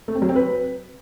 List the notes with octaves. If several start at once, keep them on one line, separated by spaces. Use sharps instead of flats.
A3
C4
F#3
C4
B4